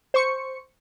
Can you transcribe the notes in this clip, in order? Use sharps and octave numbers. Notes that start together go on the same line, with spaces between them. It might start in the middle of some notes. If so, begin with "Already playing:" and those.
C5 C#6 C#7